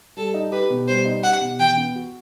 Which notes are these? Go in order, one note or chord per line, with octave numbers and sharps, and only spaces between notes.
G3 A4
D#4
G4 B4
B2
G3 C5
D#4
G4 F#5
B2
E3 G5
B3
F#4